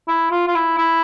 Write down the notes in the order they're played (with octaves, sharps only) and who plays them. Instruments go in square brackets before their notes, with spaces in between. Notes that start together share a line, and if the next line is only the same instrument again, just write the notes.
[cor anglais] E4
F4
F4
E4
E4